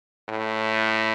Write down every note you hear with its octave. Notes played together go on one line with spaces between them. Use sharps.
A2